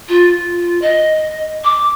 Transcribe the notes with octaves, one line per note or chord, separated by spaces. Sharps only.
F4
D#5
D6